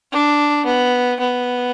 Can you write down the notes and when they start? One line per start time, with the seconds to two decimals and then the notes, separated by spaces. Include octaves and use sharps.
0.12 D4
0.66 B3
1.20 B3